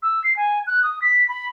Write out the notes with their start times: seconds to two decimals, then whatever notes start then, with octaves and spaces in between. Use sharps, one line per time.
0.03 E6
0.24 C7
0.36 G#5
0.67 F#6
0.83 D#6
1.02 B6
1.28 B5